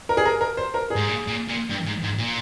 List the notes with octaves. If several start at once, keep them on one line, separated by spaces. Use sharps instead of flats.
A#4
G#4
A#4
A#4
C5
A#4
G#4
G#2
A#2
A#2
A#2
G2
G#2
G#2
A#2